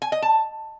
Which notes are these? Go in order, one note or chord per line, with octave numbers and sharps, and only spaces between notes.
G#5
D#5
A5